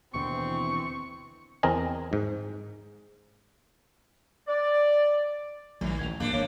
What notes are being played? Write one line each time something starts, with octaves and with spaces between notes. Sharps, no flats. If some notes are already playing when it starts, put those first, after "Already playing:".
D#2 B2 D3 E3 C4 C#6
E2 C4 A#4 D#5 G#5
G#2
D5
A#1 D#3 F#3 G3 A3
A1 D2 G#6 F7
A#1 G#2 B2 G3 A#3 D4
G#1 A#3 C#5 F5 D7